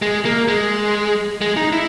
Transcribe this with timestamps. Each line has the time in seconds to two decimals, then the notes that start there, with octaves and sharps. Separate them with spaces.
0.02 G#3
0.25 A#3
0.48 G#3
1.41 G#3
1.57 D#4
1.73 E4